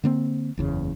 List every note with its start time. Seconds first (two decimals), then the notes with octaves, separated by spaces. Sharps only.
0.04 D3 A#3 C4
0.57 F#1 E2 C#3